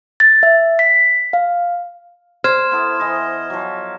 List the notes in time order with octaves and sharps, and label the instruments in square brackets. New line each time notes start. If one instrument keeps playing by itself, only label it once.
[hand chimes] A6
E5
B6
F5
[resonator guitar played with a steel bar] C5 [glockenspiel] F6 G#6 E7
[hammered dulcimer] B3 E4 A4
E3 D#5
F3 F#3